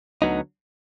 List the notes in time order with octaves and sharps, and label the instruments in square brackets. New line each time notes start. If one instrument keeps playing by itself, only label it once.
[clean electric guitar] D2 D3 F#3 B3 D#4